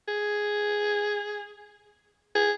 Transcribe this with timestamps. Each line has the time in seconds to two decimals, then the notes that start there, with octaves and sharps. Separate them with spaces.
0.08 G#4
2.35 G#4